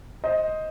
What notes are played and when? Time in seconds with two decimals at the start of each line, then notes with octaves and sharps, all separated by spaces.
0.24 C5 D#5